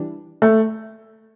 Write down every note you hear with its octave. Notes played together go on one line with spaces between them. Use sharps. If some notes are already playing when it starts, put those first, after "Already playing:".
Already playing: E3 G3 D4
A3